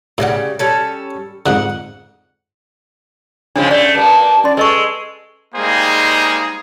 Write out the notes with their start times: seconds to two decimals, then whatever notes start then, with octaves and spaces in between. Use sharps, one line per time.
0.18 A2 C#3 E3 G3 F#5
0.59 G3 C#4 A4
1.46 F2 G#2 D3 F#5
3.56 C#3 F3 G#3 D4
3.71 A3 D5
3.95 G2 A#3 A5
4.44 C#4 D5 C6
4.57 G#3 A4 B4 D#5 C#6
5.55 G3 G#3 A#3 D#4 G#4 C5